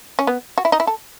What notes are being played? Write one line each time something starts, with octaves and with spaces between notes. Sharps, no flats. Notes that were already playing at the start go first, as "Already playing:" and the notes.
C#4
B3
F#4
E4
D#4
E4
A4